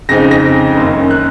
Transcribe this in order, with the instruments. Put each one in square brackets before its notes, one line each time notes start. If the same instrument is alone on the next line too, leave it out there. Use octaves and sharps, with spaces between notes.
[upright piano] F2 C#3 G#3 C4 D#4 A#6
A#6
F#2 D#3 A#3 C#4
F#6